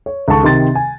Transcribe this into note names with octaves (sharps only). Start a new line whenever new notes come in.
C#5
C#2 D#3 A4 A5 C#6
C3 D#3 C6 A6
G#5